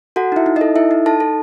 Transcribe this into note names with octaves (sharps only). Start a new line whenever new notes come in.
F#4 A4 F#5
D#4 E4 E5
D#4
D#4 D#5
A4
E4 A4 E5
D#4
D#4 A4 A5
A4